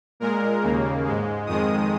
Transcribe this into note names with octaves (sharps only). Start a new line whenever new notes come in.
A#2 G#3 A#4
D#2 C#3 A#3
G#2 G#3
F2 D#3 G#3 D#6